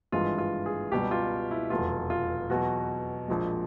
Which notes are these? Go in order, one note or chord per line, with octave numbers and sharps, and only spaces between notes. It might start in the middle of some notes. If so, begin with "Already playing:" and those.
G#1 G2 E3 G#3 F4
F4
G#4
C#2 B2 G3 G4
F4
E4
F1 E2 B2 F#3 F4
F4
E2 B2 F#3 F#4
A#1 A#2 F3 G#3